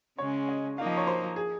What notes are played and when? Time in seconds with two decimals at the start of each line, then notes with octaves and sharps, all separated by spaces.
0.18 C#3 G#3 C#4 C#5
0.49 D#5
0.77 F3 A#3 D#4 F5
0.87 D#5
0.97 C#5
1.07 C5
1.36 G#4